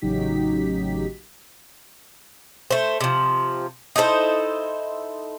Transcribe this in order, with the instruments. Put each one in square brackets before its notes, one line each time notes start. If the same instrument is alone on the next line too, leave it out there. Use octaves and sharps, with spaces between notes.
[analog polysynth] A1 C#3 F#3 D#4 G4 B6
[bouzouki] A3 C5
C3 F3
D#4 E4 A4 C5